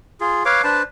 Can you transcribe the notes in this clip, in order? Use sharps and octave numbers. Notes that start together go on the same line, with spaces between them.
F4 G#4
B4 C#5 F5 D6
D4 B4 C5 A5